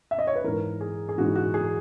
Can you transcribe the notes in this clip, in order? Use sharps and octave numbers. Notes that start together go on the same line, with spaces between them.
E5
D#5
C#5
B4
G#2 E3 A#4
G#4
G#4
G#2 E3 F#4
F#4
G#4